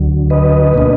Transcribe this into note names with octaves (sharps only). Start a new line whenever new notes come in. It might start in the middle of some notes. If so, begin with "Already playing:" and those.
Already playing: D2 D3 F#3
B4 D#5
B2 A#3 D4